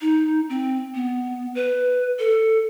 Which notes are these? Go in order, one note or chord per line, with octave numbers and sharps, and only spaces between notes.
D#4
C4
B3
B4
A4